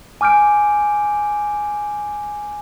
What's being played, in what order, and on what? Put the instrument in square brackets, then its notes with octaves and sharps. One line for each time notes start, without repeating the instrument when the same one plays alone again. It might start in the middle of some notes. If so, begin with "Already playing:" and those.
[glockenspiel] G#5 D6 F6 G6 D7